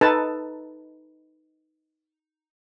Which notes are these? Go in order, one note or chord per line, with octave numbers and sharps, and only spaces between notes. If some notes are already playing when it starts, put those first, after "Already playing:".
D#4 A4 B4 A5